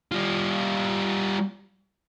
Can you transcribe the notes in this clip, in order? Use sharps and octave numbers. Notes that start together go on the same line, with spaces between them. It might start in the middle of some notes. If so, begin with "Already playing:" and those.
G3 F4